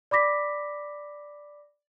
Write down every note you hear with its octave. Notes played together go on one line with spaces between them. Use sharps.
D5 B5 D6 A#6 B6